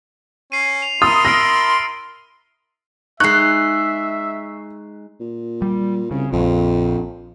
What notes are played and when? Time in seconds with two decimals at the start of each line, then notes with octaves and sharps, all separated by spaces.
0.52 C#4 C7 D#7
0.82 F7
1.02 E4 A#4 C6 D#6 A6
1.25 E6 F6 A#6 D7
3.20 G#3 D#4 E5 C#6 F#6 C7
5.20 A#2
5.62 G3
6.11 C2 C#3
6.33 A#1 F2